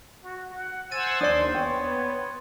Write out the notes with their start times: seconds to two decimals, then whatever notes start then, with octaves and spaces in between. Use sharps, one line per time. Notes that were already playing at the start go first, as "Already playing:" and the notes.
0.23 F#4
0.54 F#5
0.91 C5 F#5 G#5 E6 A6 D#7
1.21 D#2 D4 D5 C6 D#6
1.55 B3 C#5 G5